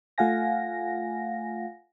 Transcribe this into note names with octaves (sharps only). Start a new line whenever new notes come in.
A3 F4 F5 F#5 G#5 A#6